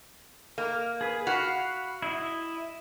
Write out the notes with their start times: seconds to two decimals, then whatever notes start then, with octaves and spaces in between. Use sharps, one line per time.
0.58 A#3
1.01 G#4 B4
1.27 F#4 F5 F#5 B5
2.02 E4 D#5